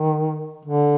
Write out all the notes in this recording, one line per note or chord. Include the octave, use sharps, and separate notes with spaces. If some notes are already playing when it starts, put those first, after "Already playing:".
Already playing: D#3
D3